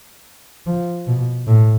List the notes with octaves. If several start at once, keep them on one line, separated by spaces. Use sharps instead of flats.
F3
B2
A2